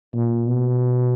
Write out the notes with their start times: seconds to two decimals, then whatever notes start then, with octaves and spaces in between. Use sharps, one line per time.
0.14 A#2
0.47 B2